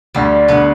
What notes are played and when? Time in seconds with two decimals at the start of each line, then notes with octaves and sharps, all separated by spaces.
0.14 D2 G3
0.48 D3 B3